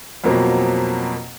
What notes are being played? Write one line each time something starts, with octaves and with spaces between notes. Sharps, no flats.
F2 B2 F#3 A#3 C4